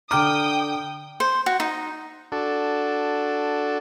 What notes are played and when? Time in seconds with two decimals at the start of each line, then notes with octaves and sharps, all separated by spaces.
0.11 D3 G5 A#5 D6 D#6 F6
1.20 C5
1.46 F#4
1.60 D#4
2.32 D4 F#4 A4